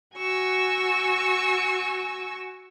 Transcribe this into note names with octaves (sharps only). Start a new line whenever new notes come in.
F#4 G#5 C#6 E6